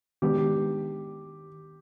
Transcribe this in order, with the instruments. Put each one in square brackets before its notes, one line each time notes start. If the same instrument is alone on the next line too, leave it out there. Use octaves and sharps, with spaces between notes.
[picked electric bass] D#3 G#3 B3 D4 [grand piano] G4